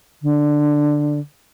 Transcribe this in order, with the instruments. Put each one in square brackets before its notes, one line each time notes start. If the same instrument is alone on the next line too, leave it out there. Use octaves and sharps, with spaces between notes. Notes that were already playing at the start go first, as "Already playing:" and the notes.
[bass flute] D3